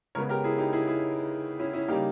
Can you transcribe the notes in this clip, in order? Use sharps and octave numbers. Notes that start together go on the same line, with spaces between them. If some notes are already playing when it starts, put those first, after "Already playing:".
C#3 G#3 B3 A#4 C#5
G4 A#4
E4 G#4
D#4 G4
E4 G#4
E4 G#4
C#4 E4
C#4 E4
C#3 G3 A#3 D#4 G4